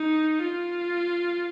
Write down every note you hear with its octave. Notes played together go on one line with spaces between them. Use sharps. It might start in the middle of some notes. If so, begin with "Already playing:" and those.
Already playing: D#4
F4